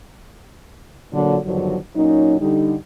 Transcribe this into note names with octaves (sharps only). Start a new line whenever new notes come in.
A#2 D3 F#3
E2 G2 D3 D#3 F3 F#3
A#2 F#3 C#4 D#4
D3 G3 D#4